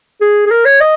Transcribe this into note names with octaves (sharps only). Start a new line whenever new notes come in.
G#4
G#4
A#4
C#5
D#5